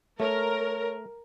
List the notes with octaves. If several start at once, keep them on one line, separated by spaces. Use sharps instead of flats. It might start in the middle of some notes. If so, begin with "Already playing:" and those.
A3 A#4 C#5